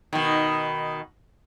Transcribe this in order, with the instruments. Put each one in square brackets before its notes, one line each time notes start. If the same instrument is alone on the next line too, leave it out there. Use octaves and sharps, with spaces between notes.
[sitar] B2 D#3